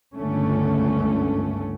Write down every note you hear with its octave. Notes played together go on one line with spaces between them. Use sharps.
G1 C#2 D3 A3 C#4